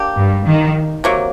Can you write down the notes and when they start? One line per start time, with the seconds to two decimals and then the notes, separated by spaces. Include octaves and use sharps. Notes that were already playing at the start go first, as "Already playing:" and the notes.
Already playing: A#3 D4 G4
0.16 G2
0.46 D#3
1.04 C3 F#3 A#3